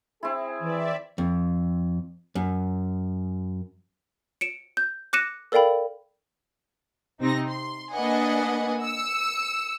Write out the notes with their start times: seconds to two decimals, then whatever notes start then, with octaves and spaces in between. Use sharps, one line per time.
0.23 C4 E4 G#4
0.61 E3 D5 E5
1.18 F2
2.35 F#2
4.41 C#7 D7 E7
4.77 G6
5.13 D6 F#6 A#6 C#7 D#7 E7
5.52 A4 A#4 D5 F5 G5 B5
7.21 C3 C4 D#4 A#6
7.50 C6
7.93 A#3 D4 B4 D#5 F#5 G#5
8.83 E6 C#7